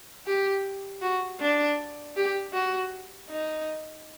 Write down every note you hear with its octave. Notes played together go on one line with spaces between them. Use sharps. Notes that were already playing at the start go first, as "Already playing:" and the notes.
G4
F#4
D4
G4
F#4
D#4